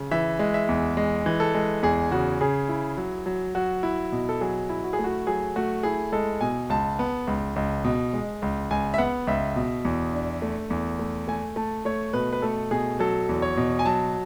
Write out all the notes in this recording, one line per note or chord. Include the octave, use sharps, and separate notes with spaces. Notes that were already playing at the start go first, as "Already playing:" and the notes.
Already playing: C#3
E3 E5
G#3
E5
E2
G#3
E3
A4
G#3
E2 G#4
C#3 F#4
C#3 G#4
E4
F#3
F#3
F#3 F#4
E4
B2
A4
F#3 G#4
E4
F#4
G#4
A3
F#4
F#3 G#4
A3 F#4
E4 G#4
G#3 A4
B2 G#5
C#2 A5
B3
C#2
C#2
B2
G#3
C#2
C#2 G#5
E5
B3 F#5
C#2 E5
B2
E2
D4
A3
E2
A3
A3 G#5
A3 A5
A3 C#5
B2 B4
B4
A3 A4
B2 G#4
F#3 A4
E2
C#5
B2
G#5
F#3 A5